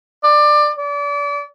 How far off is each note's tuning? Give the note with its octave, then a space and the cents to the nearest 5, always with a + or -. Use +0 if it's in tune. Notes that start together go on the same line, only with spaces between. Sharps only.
D5 +20
D5 -35